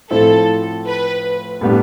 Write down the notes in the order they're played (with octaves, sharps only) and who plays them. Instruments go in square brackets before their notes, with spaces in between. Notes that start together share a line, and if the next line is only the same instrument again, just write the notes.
[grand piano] A2 F3 C4 E4 [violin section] A4
[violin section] B4
[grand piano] A2 G3 B3 D4